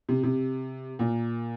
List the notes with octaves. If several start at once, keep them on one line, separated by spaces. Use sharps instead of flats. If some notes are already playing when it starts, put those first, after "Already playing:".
C3
C3
A#2